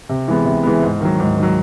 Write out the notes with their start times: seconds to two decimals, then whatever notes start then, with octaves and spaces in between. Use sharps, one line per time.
0.09 C3
0.28 E3 G#3 B3
0.45 C3
0.63 E3 G#3 B3
0.83 G#2
1.01 D#3 F#3
1.20 G#2
1.37 D#3
1.43 F#3